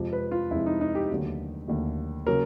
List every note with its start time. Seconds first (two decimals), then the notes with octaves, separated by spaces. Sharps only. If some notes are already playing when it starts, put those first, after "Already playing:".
Already playing: F2 C3 F3 G#3
0.13 B4
0.31 F4
0.51 F2 C3 F3 G#3 E4
0.66 D#4
0.81 D#4
0.95 G4
1.10 D#2 D3 F#3 A3
1.68 D#2 D3 F#3 A3
2.26 C#3 F#3 A#3 C#4 A#4